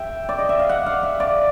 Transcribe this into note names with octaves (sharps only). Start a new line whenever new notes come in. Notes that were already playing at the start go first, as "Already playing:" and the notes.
Already playing: E5 G5
D5
D#5
E5
F5
F#5
F5
E5
D5